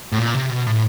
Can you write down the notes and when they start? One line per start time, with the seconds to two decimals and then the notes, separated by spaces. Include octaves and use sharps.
0.12 A2
0.18 A#2
0.35 C3
0.50 B2
0.67 A2